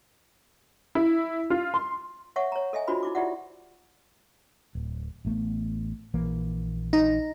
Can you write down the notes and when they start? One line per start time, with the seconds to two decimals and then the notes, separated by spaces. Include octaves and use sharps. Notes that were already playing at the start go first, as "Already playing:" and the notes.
0.95 E4
1.50 F4
1.74 C6
2.36 C#5 E5 F#5 C#6
2.52 C#5 A#5
2.73 A4 D#5 E5 G#5
2.88 D4 F4 F#4 C5 B5
3.03 D#4 E4 D6
3.15 E4 F4 G4 D5 E5 F#5
4.75 D1
5.25 A1 A3 B3
6.14 A#1 E3 A#3
6.93 D#4